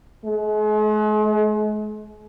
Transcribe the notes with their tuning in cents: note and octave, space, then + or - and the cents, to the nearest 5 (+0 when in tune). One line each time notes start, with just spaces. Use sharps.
G#3 +40